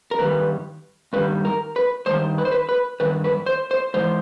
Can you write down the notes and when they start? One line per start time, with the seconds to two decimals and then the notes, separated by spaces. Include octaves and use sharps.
0.11 A#4
0.19 G2 D#3 G3 B4
1.13 G2 D#3 G3 B4
1.45 A#4
1.76 B4
2.06 G2 D#3 G3 C5
2.38 B4
2.45 C5
2.52 B4
2.69 B4
3.00 G2 D#3 B4
3.24 B4
3.46 C5
3.71 C5
3.94 G#2 E3 C5